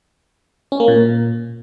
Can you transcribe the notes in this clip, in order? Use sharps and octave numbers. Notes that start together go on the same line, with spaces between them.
C#4
A#3
A#2